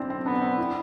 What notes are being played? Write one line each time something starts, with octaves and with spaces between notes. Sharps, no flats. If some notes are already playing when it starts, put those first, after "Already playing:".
Already playing: C4 D4 E4
C4
B3 D4
C4
E4